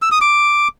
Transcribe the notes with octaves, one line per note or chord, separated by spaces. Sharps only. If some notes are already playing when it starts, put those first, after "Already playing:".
E6
D#6
D6